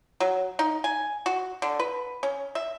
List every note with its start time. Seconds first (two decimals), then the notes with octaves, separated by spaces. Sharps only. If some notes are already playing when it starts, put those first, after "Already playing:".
0.20 F#3
0.59 D#4
0.84 G#5
1.26 F#4
1.62 D3
1.80 B4
2.23 C#4
2.55 E5